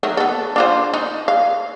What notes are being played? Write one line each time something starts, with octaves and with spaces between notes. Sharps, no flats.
D#3 F#3 A3
B3 A4
D4 F4 C5
D#4
F5